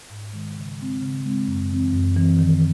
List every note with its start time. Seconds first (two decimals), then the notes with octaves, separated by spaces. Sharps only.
0.10 G#2
0.33 D#3 G#3
0.56 C#3
0.78 G#3 C4
1.02 C#3
1.25 G#3 C4
1.48 F#2
1.71 E3 C4
1.93 F#2
2.16 E3 C4
2.39 D#3